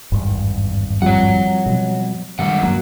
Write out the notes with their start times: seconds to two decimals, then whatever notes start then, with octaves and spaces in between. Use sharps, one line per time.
0.12 G#1 E2 G2
1.02 F3 G3 C4 C#5 F#5
1.66 B2 F#3
2.39 F#2 D3 D#3 G3 G#3 F#5
2.63 C#2 G2 F#3 A#3